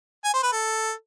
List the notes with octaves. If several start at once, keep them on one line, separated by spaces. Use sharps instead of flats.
G#5
C5
B4
A4